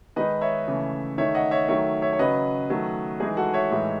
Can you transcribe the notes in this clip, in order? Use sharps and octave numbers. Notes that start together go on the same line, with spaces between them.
D#3 G#3 D#4 B4 D#5
C#5 E5
C#3 E3 A3
D#3 A3 D#4 C#5 E5
D#5 F#5
C#5 E5
D#3 F#3 A3 C#5 E5
C#5 E5
C#5
C#3 F#3 C#4 B4 D#5
D#3 F#3 A3
E3 G#3 D#4 G#4
F#4 A4
C#5 E5
A2 E3 G#3 D#4